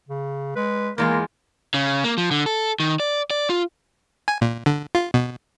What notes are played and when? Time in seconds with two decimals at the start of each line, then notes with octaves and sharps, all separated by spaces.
0.09 C#3
0.56 G#3 B4
0.98 E2 G#3 A#3 F4 A#4
1.74 C#3
2.04 A#3
2.18 F3
2.31 D3
2.46 A4
2.80 D#3
3.00 D5
3.31 D5
3.50 F4
4.28 G#5
4.41 A#2
4.66 D3
4.95 F4
5.14 B2